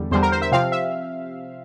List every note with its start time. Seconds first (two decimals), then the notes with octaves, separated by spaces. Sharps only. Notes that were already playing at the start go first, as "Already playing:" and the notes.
Already playing: E2 D3 G3
0.11 E2 D3 G3 C5
0.22 A#4
0.32 C5
0.42 E5
0.52 C3 F3 C4 F5
0.72 E5